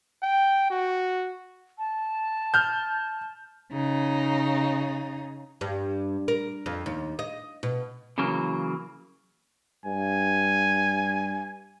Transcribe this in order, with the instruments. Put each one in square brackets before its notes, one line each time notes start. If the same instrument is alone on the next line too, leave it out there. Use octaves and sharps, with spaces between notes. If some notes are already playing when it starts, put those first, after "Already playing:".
[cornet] G5
F#4
[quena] A5
[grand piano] F6 G6
[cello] C#3 D#4
[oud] G2
A#4
F2
D#2
D#5
B2
[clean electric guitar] C#3 E3 F#3 A#3
[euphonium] G2 [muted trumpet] G#5